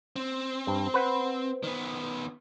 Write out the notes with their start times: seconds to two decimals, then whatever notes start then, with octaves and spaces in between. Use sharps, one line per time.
0.16 C4
0.67 G2
0.94 B4 C5 F#5
1.64 D#3 B3